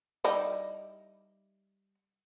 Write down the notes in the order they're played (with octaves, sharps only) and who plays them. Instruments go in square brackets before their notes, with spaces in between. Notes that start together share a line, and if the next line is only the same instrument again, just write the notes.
[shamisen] G3 D#4 E4